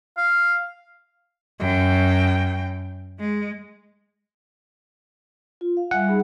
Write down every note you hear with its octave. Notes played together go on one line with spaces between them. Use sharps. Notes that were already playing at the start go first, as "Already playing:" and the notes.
F5
F#2 G5
G#3
F4
F5
G3 E5 F#5 G#5
D#4 G#4 B5